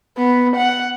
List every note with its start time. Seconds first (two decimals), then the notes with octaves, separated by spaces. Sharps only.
0.18 B3
0.56 F#5